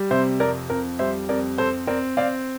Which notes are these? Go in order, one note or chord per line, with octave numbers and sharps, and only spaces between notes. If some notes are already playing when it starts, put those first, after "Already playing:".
Already playing: G3
C3 C5 E5
F2 A#4 D5
F2 A#4
G3 C5 E5
F2 A#4 D5
C4 A4 C5
C4 A#4 D5
C4 D5 F5